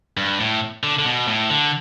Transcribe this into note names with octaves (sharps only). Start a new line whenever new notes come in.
G2
A2
D3
D3
B2
A2
D3